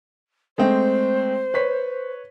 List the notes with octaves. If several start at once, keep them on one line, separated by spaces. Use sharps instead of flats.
G#3 A3 C4 C5
B4 C#5 B6